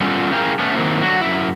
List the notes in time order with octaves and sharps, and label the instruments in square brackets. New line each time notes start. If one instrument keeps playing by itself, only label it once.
[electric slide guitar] G3 B3 C#4 F4 A4
C#4 E4 G#4 A#4 F5 G5
A3 B3 C#4
D#3 F#3 G3 A#3 C4 E4
D3 F#3 F#4
F#2 E4